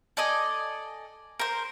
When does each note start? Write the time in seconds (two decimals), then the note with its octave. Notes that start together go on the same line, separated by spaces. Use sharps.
0.17 A4 D5 D#5 G#5
1.40 A#4 C5